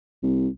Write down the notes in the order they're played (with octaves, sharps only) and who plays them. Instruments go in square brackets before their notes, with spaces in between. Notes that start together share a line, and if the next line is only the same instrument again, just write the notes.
[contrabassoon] C2